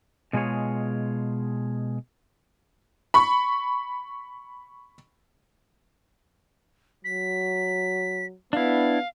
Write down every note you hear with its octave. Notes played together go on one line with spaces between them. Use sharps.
B2 G#3 F4 G#4 C#5
B5 C#6
F#3 B6
B3 D4 E4 F5